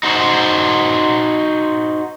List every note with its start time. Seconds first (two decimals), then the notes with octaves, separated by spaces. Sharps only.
0.03 D#4 F#4 C5